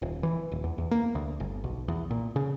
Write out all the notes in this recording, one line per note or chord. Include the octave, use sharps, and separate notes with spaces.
D#1
E3
D#1
E2
E2
A#3
D2
G1
B1
E2
A#2
C#3